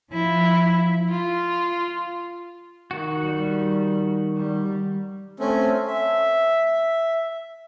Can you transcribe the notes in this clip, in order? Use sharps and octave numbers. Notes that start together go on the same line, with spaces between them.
F3 E4
F4
D#3 F#4
G3
G3
A3 C4 C#4
E5